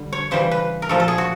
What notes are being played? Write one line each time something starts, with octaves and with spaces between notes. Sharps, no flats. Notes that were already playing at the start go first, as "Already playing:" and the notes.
Already playing: D3 G3
C#5
C#3 E3 G3 C5
B4
A#4
A#2 F3 A3 A4
A4
G#4
F#4